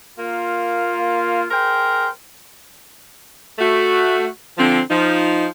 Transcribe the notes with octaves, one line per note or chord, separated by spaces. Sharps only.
A#3 F4
G#4 A#4 C5 G5
A3 F#4
D3 F3 C4
F3 D#4